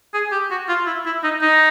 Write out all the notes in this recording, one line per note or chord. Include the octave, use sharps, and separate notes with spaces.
G#4
G4
F#4
F4
E4
E4
D#4
D#4